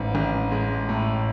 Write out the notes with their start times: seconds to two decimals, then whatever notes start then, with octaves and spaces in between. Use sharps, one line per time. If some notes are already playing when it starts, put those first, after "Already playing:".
Already playing: A1 G#2
0.15 A1
0.52 G#3
0.89 A2